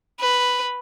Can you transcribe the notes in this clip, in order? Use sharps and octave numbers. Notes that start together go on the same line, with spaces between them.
B4